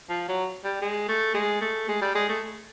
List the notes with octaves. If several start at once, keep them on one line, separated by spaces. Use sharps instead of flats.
F3
F#3
G3
G#3
A3
G#3
A3
G#3
G3
G#3
A3